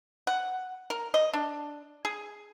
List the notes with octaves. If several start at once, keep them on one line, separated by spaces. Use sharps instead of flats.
F#5
A#4
D#5
D4
G#4